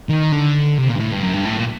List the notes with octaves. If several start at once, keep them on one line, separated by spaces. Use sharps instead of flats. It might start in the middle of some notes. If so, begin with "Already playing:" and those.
D#3
D3
C3
A#2
G2
A2
G2
F#2
G2
A2
A#2